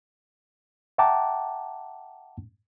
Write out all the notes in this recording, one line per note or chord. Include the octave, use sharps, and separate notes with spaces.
E5 F#5 G5 A5 A#5 D6